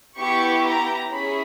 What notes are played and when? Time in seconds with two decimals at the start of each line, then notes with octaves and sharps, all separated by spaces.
0.17 B3 E4 G4 C#6
0.65 A#5
1.12 C#4 E4 G#4 B5